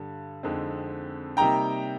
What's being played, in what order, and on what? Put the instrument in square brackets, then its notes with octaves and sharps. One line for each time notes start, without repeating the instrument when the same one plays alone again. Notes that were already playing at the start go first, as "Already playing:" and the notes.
Already playing: [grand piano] G2 D3 G3
F2 D3 G#3 C4 D#4
C3 G3 A#3 D#4 G5 A#5